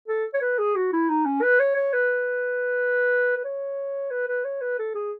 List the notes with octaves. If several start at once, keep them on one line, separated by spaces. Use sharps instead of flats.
A4
C#5
B4
G#4
F#4
E4
D#4
C#4
B4
C#5
C#5
B4
B4
C#5
B4
B4
C#5
B4
A4
G#4